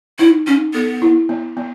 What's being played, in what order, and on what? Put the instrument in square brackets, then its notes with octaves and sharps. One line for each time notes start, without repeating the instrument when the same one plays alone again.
[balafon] D#4 [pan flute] E4
[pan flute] C#4 [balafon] D#4
[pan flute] B3 [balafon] A4
[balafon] E4
B3
B3